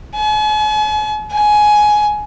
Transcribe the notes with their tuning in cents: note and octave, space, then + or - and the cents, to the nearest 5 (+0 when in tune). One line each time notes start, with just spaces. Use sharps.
G#5 +45
G#5 +15